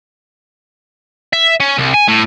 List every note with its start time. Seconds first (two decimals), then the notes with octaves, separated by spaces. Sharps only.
1.33 E5
1.60 C#4
1.78 C2
1.94 G#5
2.08 A2